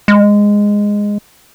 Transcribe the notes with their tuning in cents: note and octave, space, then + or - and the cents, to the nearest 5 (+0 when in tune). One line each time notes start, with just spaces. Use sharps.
G#3 -10